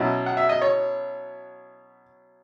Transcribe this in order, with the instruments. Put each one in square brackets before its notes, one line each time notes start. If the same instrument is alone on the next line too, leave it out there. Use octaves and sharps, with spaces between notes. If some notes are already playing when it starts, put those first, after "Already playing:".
Already playing: [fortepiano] B2 F#3 C#4 E4 D#5
F#5
E5
D#5
C#5